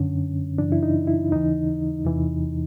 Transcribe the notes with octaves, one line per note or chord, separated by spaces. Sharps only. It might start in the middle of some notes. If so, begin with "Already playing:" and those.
Already playing: F#2 D3 C#4
F#2 C#3 E3 D4
E4
D#4
E4
D#2 C#3 E3 D#4
E2 C3 E3